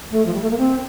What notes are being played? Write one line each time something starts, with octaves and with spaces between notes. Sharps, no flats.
A3
F3
G3
A3
A#3
C4